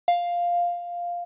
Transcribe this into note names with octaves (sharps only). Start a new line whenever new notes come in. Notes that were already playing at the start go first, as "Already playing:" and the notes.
F5